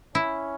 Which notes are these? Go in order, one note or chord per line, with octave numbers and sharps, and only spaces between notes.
C#4 E4